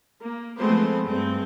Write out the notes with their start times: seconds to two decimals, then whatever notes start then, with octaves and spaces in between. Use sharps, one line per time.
0.22 A#3
0.59 F3 G#3 A3 B3 C4 C5
1.05 G2 G#3 C4